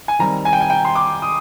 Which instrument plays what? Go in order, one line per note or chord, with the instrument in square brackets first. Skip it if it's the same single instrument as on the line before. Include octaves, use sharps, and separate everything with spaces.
[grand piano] G#5
D#3 G3 C4 A#5
G#5
G5
G#5
G5
C6
D6
D#6